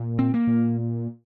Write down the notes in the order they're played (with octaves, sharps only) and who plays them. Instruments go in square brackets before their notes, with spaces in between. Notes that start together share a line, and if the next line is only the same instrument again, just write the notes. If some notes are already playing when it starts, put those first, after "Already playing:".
Already playing: [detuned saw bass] A#2
[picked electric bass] C4
A#3
[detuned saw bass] A#2